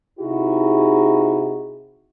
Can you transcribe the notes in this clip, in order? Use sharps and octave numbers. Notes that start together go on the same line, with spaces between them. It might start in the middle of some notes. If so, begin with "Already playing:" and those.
C3 D#4 E4 F#4 G#4